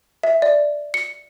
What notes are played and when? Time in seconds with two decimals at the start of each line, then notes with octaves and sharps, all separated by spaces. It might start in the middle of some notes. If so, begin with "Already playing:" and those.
0.23 E5
0.42 D5
0.94 C#7